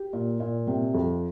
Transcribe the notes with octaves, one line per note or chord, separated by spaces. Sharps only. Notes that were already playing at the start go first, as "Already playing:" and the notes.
Already playing: G4
A#2
A#2
C3
F2